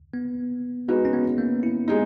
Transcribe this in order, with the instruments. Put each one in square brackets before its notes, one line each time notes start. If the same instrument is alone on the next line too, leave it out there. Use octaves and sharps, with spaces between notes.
[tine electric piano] B3
[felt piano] G#3 D#4 F#4 B4 [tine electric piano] B3
[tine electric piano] C#4
B3
A#3
E4
[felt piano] G#3 D#4